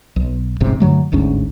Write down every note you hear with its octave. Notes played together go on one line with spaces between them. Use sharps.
B1
E1 A1 G#2 C3
G2 D3 F#3 A3
G1 D2 G#2 C#4